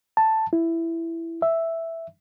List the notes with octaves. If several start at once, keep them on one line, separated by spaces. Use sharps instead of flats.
A5
E4
E5